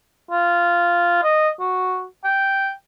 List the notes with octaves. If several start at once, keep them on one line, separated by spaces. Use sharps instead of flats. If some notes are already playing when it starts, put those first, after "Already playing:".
F4
D#5
F#4
G5